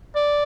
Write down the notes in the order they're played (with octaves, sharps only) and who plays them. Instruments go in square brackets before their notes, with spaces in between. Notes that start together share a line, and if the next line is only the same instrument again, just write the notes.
[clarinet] D5